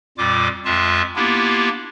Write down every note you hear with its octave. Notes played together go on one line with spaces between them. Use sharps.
F2 A#2 G3 F4 D6
F2 G#3 F4 E5 A5
A#3 B3 D4 E4 F4 G4